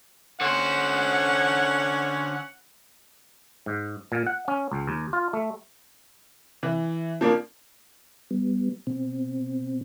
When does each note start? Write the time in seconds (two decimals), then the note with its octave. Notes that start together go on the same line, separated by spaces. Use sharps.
0.41 D3 C#4 C5 F#5
3.66 G#2
4.12 A#2
4.27 F#5
4.48 C#4
4.72 C#2
4.88 D#2
5.13 F4
5.33 A3
6.63 E3
7.21 F3 A#3 D4 A#4
8.31 G3 B3
8.87 B2 C4